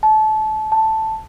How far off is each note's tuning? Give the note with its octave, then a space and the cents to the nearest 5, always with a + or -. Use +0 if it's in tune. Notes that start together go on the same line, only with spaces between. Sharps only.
A5 -25
A5 +0